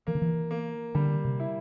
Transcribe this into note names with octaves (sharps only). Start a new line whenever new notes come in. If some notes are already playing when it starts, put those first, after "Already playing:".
E3 A#3
D3
E3
A#3
D3 G3
C3
E4